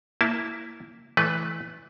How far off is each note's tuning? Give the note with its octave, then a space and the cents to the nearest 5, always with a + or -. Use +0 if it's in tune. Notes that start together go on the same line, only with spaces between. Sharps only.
A#3 +0 E4 +0 A5 -15
E3 +0 A3 -20 B4 +0